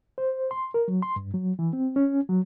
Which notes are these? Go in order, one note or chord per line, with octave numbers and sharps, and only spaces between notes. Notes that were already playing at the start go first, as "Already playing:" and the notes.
C5
C6
A#4
F#3
C6
G2
F#3
E3
C4
C#4
F#3